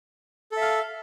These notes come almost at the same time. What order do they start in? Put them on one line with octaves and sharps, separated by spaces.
A4 E5 F5